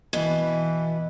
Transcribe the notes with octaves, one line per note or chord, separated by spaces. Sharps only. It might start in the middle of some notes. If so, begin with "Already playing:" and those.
B2 E3